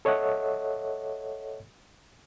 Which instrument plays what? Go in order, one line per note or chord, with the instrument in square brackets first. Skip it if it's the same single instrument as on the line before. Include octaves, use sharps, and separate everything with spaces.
[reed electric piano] A4 C#5 D#5 E5 F#5